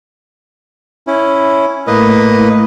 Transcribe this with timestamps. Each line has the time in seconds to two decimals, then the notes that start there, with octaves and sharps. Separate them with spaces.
1.07 C#4 E4
1.87 A2 A#3 B4 D#5